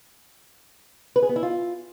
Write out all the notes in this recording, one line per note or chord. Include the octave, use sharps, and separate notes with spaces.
B4
G#4
B3
E4
F4